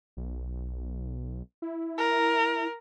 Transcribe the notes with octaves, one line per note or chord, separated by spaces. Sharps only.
B1
E4
A#4